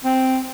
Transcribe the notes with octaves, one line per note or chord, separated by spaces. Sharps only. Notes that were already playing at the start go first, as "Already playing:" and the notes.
C4